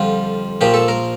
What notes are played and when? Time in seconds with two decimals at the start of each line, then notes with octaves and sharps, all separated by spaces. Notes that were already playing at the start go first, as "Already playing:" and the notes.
Already playing: F2 D3 G3 F4
0.61 A#1 A#2 F3 G4
0.74 A4
0.88 A#4